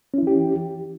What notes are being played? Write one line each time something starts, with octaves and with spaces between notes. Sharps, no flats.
E3 C#4 E4 G4